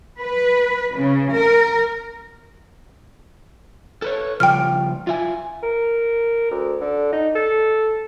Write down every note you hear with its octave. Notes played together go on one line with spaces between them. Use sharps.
B4
C#3
A#4
A4 B4 C#5
C#3 F3 G3 G5 F6
F4 E5 G#5
A#4
D2
D3
D#4
A4